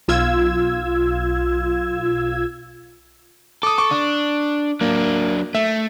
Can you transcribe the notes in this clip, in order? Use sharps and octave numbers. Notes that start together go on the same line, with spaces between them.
B1 F4 E6 G#6
A4 D6 D#6
C#6 D6
D4
F#3 A#3 D4
A3 E5